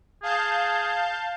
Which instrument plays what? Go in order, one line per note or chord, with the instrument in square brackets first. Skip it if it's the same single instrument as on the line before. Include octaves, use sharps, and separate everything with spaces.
[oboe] G#4 [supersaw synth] F5 A5 G6